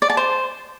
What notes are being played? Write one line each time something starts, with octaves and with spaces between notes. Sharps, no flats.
D5
A5
C5